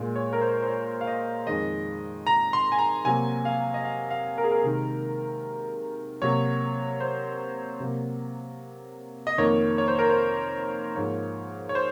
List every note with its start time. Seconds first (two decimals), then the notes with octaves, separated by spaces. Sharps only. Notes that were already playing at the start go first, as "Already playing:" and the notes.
Already playing: A#2 G#3
0.16 C#5
0.33 A#4
0.41 C5
0.63 C5
0.68 C#5
1.01 F5
1.07 D#5
1.47 F2 D#3 G#3 D#5
2.27 A#5
2.53 C6
2.72 G#5
2.79 A#5
3.05 C3 F#3 A#3 G#5
3.45 F5
3.74 D#5
3.84 F5
4.11 F5
4.38 A#4
4.44 G#4
4.51 A#4
4.64 C3 D#3 G#3
6.22 C3 F#3 A#3 C#5
7.00 C5
7.80 C3 F#3 A#3
9.27 D#5
9.38 F2 D#3 A#3 C#5
9.78 C#5
9.88 C5
9.99 A#4
10.10 C5
10.96 G#2 F3 A#3 C#5
11.69 C#5
11.75 C5